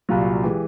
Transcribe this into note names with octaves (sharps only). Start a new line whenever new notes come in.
C2 A#2 F#3 F4
E3 G#3 G4